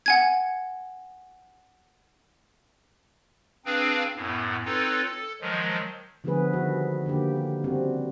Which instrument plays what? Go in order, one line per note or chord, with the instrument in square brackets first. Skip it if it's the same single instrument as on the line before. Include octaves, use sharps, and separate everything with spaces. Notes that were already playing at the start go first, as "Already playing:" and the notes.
[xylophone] F#5 G#5 G#6
[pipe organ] C4 D4 G#4 B4 F5 G5
F#2 A2 B3
C4 D#4 F4 A4 B4 C#5
A4
D#3 F3 F#3 G#3
[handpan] D3 F3 A3 B3 G#4 B4
D3 D#3 G3 F#4
D3 D#3 A#3 G4
G4
C#3 G3 C4 F#4